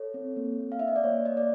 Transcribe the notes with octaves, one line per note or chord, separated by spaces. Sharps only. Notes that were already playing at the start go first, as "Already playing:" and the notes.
Already playing: A4 C#5
C4
A#3
A#3
F5
D4 E5
D#5
D5
A#3 C#5
A#3 D#5
D5